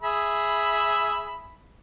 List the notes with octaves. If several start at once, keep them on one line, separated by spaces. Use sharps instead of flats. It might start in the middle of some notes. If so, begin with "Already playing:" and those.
G#4 E5 B5